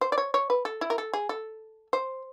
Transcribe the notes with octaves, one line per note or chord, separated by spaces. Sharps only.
C5
D5
C#5
C#5
B4
A4
E4
A#4
A4
G#4
A4
C5